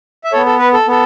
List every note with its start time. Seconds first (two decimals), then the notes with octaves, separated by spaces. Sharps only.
0.24 E5
0.32 B3 A4 C#5
0.46 A4
0.59 B4
0.73 A4
0.88 B3 A4